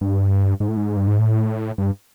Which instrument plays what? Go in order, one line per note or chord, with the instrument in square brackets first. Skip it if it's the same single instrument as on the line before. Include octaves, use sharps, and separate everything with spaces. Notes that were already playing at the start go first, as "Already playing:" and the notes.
[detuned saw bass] G2
G#2
A2
G#2
G2
G#2
A2
G2